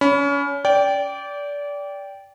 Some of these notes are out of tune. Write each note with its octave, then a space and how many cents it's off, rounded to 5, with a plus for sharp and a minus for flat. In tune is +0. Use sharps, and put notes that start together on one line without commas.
C#4 +30 B5 +0
D5 -25 G5 +0